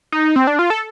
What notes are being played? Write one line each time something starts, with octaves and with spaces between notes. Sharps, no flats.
D#4
C4
D4
F4
A4